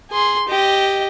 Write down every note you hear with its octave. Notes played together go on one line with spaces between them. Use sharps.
G#4 C6
G4 D#5